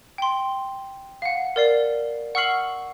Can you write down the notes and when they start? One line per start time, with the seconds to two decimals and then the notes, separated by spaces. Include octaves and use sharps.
0.18 G5 C6
1.22 F5 F#5
1.56 A#4 D5 C7
2.35 F#5 C#6 E6 F6 C7 F#7